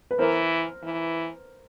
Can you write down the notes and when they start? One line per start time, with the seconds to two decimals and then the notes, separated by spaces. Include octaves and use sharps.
0.11 B4
0.19 E3 A#4 C5
0.84 E3